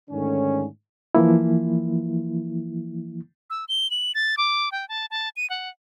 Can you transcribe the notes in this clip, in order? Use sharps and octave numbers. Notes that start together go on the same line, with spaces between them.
G#2 D3 D#3 A3 C#4
E3 F3 A#3 E4
E6
G7
F#7
A6
D6
G5
A5
A5
D#7
F#5